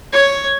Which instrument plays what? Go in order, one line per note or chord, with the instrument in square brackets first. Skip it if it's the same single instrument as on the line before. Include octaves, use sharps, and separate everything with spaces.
[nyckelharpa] C#5